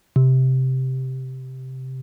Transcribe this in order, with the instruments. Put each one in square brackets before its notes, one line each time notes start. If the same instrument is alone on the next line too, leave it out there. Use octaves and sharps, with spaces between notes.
[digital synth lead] C3